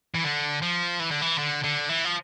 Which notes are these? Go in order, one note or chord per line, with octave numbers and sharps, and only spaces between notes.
E3
D3
F3
E3
D3
E3
D3
D3
E3
F3